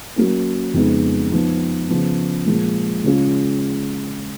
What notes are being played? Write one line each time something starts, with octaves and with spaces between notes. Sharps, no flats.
F#3 A#3 C#4
F2 C#3 G#3 B3 D#4
F3 B3 D#4
C#3 F3 B3
A#2 F3 G#3
C#3 G#3 C#4 F4